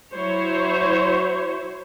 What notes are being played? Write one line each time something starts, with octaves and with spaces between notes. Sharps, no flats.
F#3 E4 C5 C#5